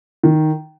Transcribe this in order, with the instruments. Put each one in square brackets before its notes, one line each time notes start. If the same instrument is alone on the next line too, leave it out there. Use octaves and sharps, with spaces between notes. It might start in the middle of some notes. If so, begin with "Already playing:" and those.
[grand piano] D#3